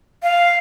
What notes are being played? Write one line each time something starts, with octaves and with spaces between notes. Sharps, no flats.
F5